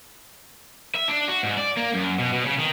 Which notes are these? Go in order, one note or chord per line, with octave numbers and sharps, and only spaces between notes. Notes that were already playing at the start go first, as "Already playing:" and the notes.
E5
D4
F#4
G#2
D5
A#3
F#2
B2
B2
C#3
D#3